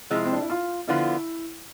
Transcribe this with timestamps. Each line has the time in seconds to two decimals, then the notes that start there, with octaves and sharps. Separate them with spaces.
0.10 C3 F3 G#3 E4
0.25 C4
0.32 D4
0.41 E4
0.50 F4
0.87 D3 F3 B3 E4 F4